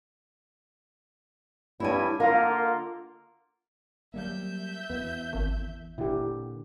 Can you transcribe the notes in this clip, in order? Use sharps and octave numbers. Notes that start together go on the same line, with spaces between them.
G2 E4 C#5 G#5
D3 A#3 F4 A#4 D#5 F5
F#3 G3 A#3 E5 G6
E2 B3
G#1
A#2 D3 E4 G4